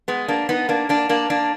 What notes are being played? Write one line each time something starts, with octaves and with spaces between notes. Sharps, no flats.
G#3 B3
A#3 D4
B3 D#4
A#3 D4
A#3 D4
A#3 D4
A#3 D4